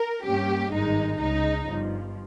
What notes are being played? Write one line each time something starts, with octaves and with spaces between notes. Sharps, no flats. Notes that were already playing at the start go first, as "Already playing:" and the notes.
Already playing: A#4
G2 G3 A#3 C#4 G4
G#1 G2 D#3 G#3 D#4
C#2 C#3 G#3 D#4
G1 G2 F3